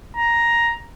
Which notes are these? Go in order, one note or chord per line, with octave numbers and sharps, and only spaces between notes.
A#5